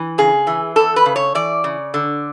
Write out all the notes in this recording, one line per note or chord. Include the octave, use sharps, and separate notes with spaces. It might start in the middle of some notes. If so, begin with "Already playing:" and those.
Already playing: E3
C#3 G#4
E3
E2 A4
B4
C#3
C#5
E3 D5
C#3
D3